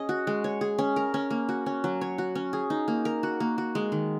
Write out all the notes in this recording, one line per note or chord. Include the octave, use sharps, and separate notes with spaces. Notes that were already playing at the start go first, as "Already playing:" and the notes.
Already playing: C#4 G#4 D#5
F#4
G#3
C#5
G#4
C#4
A#4
C#4
A#3
F#4
C#4
F#3
C#5
F#4
C#4
G#4
D#4
A#3
A#4
F#4
A#3
F#4
G#3
D#3